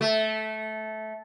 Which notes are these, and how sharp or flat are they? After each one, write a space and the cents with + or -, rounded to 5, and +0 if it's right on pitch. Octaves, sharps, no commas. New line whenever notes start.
A3 -15